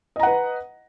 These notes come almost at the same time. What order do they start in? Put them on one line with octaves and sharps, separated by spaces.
D#5 A#5 F#5 B4